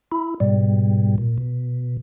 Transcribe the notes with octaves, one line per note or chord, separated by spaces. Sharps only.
E4
G#2 B2 G3
A#2
B2